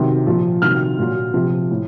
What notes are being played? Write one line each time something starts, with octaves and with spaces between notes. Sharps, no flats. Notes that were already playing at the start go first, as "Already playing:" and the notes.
Already playing: C3 D#3 F#3
A#2 F3
C3 D#3 F#3 F6
A#2 F#3
C3 F3
A2